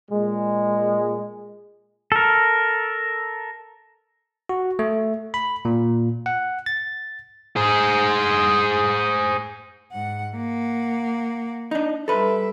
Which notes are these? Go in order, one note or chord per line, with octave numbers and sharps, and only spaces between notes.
A#2 G#3
A4 A#4
F#4
A3
B5
A#2
F#5
A6
G#4 C5
G#2 F#5
A#3 F#5
D4 D#4
G3 A4 B4 E5